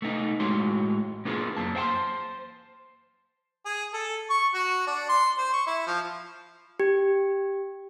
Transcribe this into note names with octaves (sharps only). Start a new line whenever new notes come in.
A3 B3 D#4
A2 G#3 F#4 C#5 C6
A#3 B3 D4 F4 G#4
F#2 A#3 A5
C5 E5 G5 A5 C6
G#4
A4
C#6
F#4
D4
C6
C5
C#6
E4
F3
G4